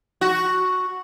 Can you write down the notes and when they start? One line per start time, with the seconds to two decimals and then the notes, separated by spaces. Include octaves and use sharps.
0.21 F#4